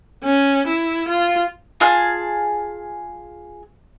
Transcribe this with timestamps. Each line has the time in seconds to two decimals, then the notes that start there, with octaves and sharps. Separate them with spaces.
0.24 C#4
0.67 E4
1.08 F4
1.80 F4 G#4 A5 F6